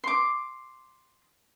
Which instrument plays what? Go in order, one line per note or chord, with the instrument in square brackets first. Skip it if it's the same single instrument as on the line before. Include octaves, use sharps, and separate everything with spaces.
[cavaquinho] C6 D6